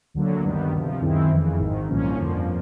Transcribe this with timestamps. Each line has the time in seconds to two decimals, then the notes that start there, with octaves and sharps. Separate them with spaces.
0.14 D2 D3 F#3 A#3
0.44 G2 D#3 G3 B3
0.72 D2 C3 F3
1.01 F#2 D#3 G#3 C4 E4
1.31 F2 C#3 E3
1.60 G#1 G#2 D#3
1.88 C2 A#2 F3 A#3 C#4
2.17 G1 F2 D3 F3 A#3